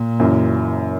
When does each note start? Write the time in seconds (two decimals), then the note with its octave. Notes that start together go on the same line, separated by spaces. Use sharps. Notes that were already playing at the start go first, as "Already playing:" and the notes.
Already playing: A#2
0.19 F#1 F#2 E3